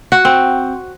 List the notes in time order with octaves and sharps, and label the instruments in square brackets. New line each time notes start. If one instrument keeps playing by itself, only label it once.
[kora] F#4
C4